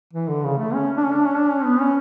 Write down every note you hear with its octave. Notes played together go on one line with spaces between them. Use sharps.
E3
D3
C#3
A3
C#4
D4
C#4
D4
C#4
D4
C#4
B3
C#4